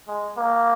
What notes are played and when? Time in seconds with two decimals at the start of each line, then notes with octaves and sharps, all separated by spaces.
0.08 G#3
0.37 A#3